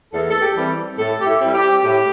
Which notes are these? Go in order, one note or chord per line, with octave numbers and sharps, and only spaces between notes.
E2 A4
A4
G4
E3 G3 C4
A2 A4
G4
E4
G3 C4
G4
A2 G4